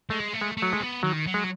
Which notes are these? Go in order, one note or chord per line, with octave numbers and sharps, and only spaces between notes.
G#3 A3
A3
G#3
A3
F#3
G#3
B3
D#3 F#3
F#3
G#3